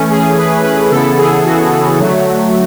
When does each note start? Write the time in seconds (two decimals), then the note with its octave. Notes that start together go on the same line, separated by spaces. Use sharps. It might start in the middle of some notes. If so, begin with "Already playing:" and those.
Already playing: E3 A3 C#4
0.10 G#4
0.38 B4
0.64 B4
0.91 C#3 E3 B3 E4 A4
1.18 G#4
1.45 F#4
1.98 D3 F#3 A3